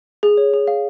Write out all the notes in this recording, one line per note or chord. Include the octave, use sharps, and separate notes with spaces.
G#4
C#5
G#4
F5